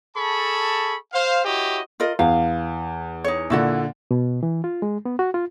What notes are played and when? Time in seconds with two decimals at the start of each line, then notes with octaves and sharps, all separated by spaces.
0.16 G#4 A4 A5 B5 C#6
1.13 C5 F5
1.45 E4 F#4 G4 C#5 D#5
2.00 F4 A#4 D#5
2.19 E2 F5
3.24 D#4 C#5
3.50 A#2 D3 E4 F#4 F#5
4.11 B2
4.43 E3
4.64 F4
4.82 G#3
5.05 B3
5.19 F#4
5.34 F4